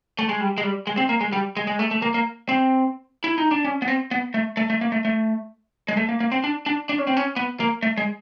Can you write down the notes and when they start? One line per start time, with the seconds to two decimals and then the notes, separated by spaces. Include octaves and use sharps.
0.19 A3
0.29 G#3
0.41 G3
0.58 G#3
0.63 G3
0.87 G#3
0.97 C4
1.09 A#3
1.21 G#3
1.33 G3
1.57 G#3
1.67 G#3
1.79 A3
1.91 A3
2.02 A#3
2.14 A#3
2.49 C4
3.24 E4
3.38 D#4
3.51 D4
3.65 C#4
3.82 B3
3.88 C4
4.11 B3
4.34 A3
4.57 A3
4.70 A3
4.81 A#3
4.92 A3
5.05 A3
5.88 G#3
5.97 A3
6.09 A#3
6.20 A#3
6.32 C4
6.44 D4
6.66 D4
6.89 D4
6.98 C#4
7.07 C4
7.17 C#4
7.36 B3
7.60 A#3
7.83 A3
7.97 G#3